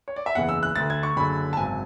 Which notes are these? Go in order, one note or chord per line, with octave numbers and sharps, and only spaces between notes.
C#5
D5
E5
F#1 E2 C#3 E3 F#5
E6
F#6
D2 D3 A6
G#6
C#6
F#1 F#2 D3 B5
A5
G#1 F#2 C#3 G#5